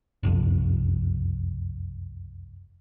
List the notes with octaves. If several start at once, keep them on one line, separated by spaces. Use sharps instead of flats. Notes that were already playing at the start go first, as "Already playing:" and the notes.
F#1 C2 F2